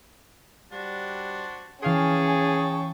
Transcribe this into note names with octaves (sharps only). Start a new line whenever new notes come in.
G3 D4 F#4 C5
E3 C#4 G#4 F5 G5 A5 C#6 C7